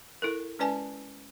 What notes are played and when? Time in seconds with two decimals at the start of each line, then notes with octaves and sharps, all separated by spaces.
0.22 E4 A4 A#4
0.59 G#3 C#4 B4 D5 G#5 A5